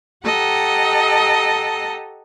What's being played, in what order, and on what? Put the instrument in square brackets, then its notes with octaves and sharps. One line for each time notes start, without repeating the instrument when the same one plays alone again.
[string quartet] G4 A4 D#5 F#5 A#5